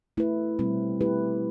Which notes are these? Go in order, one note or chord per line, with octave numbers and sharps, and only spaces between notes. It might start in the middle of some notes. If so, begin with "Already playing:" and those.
A3 E4 B4
B2 G3 C4
A3 E4 G4 B4